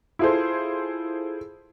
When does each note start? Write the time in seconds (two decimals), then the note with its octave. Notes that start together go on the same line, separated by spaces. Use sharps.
0.19 E4 F4 G#4 A4 C5